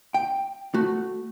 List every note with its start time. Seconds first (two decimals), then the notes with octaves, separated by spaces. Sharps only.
0.14 G5
0.74 A3 F#4